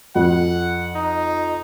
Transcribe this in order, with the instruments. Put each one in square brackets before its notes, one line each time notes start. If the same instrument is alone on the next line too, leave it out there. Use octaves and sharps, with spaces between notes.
[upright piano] F2 [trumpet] F#5
[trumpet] D#4